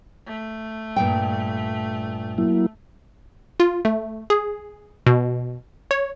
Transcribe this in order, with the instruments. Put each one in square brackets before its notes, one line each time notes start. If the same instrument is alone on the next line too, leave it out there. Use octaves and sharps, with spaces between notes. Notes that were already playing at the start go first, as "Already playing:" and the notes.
[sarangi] A3
[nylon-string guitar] G2 A#2 G5
[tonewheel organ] F#3 A#3 E4
[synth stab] F4
A3
G#4
B2
C#5